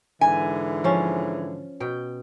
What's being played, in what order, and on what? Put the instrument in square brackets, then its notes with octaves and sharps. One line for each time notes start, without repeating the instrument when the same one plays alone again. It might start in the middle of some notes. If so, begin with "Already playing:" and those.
[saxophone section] G#2 D3 E3 [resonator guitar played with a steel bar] G#5
[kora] F3 C#4
B2 G5